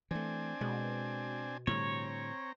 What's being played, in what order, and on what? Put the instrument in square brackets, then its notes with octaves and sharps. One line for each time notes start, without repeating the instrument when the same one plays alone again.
[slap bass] E3 A3 [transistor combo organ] C4 D4 G#5
[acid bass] B2 [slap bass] G#3
[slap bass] A2 D3 G3 [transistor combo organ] C4 A#5 [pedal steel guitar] C#5